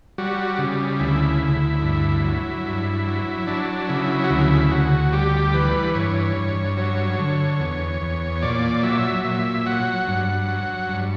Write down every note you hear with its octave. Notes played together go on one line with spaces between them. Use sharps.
G3 F#4
C#3
D2 E4
D2
G2
F#3
G2
F#3
F#3 D4
C#3 E4
F#4
D2 E4
D2 F#4
G3 G4
E3 B4
G2 C#5
G2
F#3 C#5
D3
E2
E2
A#2 D5
F#3 E5
A#2 E5
F#3 F#5
G2
F#3
G2